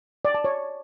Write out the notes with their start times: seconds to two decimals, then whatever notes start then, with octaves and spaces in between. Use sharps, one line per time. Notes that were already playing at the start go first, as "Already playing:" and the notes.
0.25 D5
0.35 A5
0.44 C#5